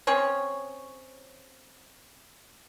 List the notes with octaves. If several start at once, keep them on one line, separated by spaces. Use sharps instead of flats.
C4 C#4 G#4 C#5